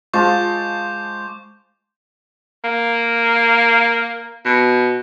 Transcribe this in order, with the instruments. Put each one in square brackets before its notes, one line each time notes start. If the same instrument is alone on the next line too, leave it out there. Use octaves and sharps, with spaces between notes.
[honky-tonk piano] G#3 [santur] F4 [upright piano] C5 A5 [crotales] C#6 D6 G6
[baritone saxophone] A#3
B2